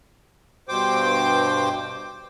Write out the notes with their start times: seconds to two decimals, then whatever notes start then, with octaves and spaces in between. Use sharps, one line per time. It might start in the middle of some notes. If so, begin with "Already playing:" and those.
0.69 G2 B2 C5 G5 D6